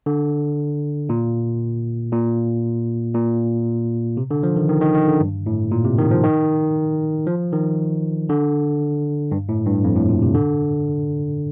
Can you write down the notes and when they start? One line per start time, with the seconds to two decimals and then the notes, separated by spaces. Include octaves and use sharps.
0.06 D3
1.09 A#2
2.13 A#2
3.14 A#2
4.17 C3
4.31 D3
4.43 F3
4.56 D#3
4.69 D#3
4.82 D#3
4.95 D#3
5.08 D3
5.20 G2
5.46 A2
5.71 A#2
5.85 C3
5.98 D#3
6.11 F3
6.23 D#3
7.27 F3
7.53 D#3
8.29 D3
9.31 G2
9.49 A2
9.67 G2
9.84 F2
9.96 A2
10.09 A#2
10.22 C3
10.35 D3